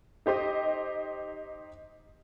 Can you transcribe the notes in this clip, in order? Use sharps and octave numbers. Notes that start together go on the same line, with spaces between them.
D#4 G4 C5 D#5